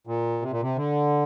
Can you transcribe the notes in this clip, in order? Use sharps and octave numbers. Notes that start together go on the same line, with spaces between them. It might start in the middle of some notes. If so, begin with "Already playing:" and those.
A#2
C3
A#2
C3
D3